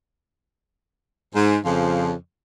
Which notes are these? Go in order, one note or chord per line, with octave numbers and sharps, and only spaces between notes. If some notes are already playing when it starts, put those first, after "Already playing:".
G#2
F2 C#3 F3